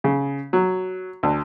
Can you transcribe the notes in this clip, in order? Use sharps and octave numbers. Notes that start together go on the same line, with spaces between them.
C#3
F#3
D2